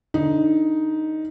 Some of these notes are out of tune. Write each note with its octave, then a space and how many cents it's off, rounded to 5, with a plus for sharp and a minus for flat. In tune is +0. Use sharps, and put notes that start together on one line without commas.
D3 +0 D#4 +5